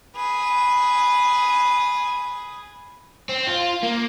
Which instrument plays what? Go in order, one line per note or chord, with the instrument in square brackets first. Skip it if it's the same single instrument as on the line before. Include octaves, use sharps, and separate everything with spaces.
[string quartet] G#4 B4
[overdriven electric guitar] C4
F4
A#3